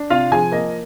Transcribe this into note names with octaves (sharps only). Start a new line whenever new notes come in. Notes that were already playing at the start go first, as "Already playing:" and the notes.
Already playing: D4
C3 F4 F5
F3 G#4 G#5
A#3 D#5